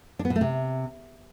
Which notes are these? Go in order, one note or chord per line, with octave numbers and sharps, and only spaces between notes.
D4
B3
B2
A3
C3